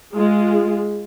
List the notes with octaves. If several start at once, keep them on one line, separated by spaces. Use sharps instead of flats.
G#3 F4 G#4